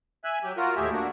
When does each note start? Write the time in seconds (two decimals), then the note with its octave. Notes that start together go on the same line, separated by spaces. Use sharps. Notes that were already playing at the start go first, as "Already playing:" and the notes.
0.24 E5 G#5 F#6
0.44 F#3 G4
0.57 F4 F#4 A#4
0.76 D#2 A2 G4 G#4 E5
0.92 A#3 D4 F#4